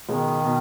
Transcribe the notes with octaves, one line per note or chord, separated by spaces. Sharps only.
C#2 B2 D#3 G#3
B2